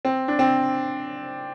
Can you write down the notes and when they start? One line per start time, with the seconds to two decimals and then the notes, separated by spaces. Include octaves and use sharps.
0.05 C4
0.28 D4
0.39 C4